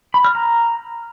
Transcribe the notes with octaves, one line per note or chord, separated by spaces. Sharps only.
B5
F6
A#5